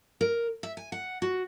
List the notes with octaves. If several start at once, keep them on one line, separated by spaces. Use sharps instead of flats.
A#4
E5
G#5
F#5
F#4